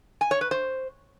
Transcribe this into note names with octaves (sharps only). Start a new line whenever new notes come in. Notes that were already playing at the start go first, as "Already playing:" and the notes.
G#5
C#5
B4
C5